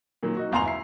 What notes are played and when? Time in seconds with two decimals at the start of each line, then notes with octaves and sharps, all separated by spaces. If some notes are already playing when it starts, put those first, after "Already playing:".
0.23 A#2 D#3 F#3
0.37 D#4 F#4
0.52 G1 E2 F5 A#5 C6 F7
0.65 E4 C7